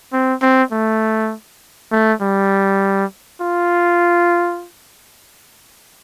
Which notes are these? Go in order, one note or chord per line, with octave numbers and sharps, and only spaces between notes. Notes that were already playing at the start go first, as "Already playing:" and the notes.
C4
C4
A3
A3
G3
F4